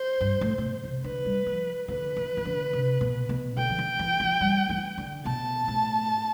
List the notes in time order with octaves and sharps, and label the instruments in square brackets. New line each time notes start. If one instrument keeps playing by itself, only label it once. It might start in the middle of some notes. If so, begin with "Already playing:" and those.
Already playing: [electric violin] C5
[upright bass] G2
A2
A2
B2
C3
[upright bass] D3 [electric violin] B4
[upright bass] G3
F3
[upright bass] D3 [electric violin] B4
[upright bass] E3
E3
D3
C3
B2
B2
[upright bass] D3 [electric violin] G5
[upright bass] F3
E3
E3
F3
G3
E3
D3
[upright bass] B2 [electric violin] A5
[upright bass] A2